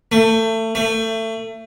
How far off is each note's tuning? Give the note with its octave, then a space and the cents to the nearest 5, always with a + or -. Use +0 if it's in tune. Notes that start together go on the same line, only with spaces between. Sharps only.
A3 +25
A3 +25